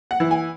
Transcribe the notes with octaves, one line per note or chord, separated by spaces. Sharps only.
F#5
E3
G#5